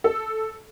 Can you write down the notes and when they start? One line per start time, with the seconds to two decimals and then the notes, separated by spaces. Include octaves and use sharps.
0.04 A4